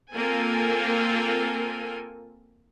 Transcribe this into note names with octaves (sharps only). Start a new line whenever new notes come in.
A#3 C4 F4 A4 A#4 G#5